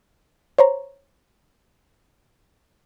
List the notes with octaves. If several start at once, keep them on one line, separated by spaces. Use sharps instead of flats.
C5 C#5 A#5